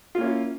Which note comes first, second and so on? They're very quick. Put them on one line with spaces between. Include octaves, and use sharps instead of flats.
F4 A#3 C#4 E4